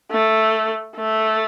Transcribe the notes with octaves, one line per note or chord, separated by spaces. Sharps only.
A3
A3